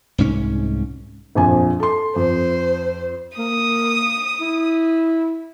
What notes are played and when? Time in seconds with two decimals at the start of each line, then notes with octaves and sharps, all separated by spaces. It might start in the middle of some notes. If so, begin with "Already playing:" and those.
0.18 C2 G#2 C#4
1.35 A#1 F2 G#5
1.80 A4 C6
2.16 F2 C5
3.38 A#3 D#6
4.41 E4